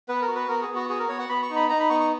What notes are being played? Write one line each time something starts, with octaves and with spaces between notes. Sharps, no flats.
B3 B4
A#4
F#4
B4
B3 A#4
G#4
B3
F#4
F#4 G#4
A#4
B3 C#5
F#5
B3 B5
C#6
D#4
B5
D#4 A#5
B5
B3 C#6
C#6